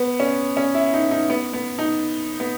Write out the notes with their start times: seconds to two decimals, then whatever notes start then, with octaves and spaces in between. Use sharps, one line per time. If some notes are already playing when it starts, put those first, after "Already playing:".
Already playing: B3
0.20 C#4
0.57 C#4
0.74 E4
0.94 D#4
1.11 D#4
1.30 B3
1.53 B3
1.79 D#4
2.40 B3